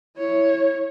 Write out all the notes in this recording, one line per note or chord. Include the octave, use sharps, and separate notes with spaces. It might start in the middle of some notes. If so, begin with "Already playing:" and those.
E4 C#5